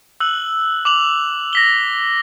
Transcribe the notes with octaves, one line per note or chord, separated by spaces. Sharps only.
E6 F#6 F#7
D6 F7 F#7
A#6 B6 G7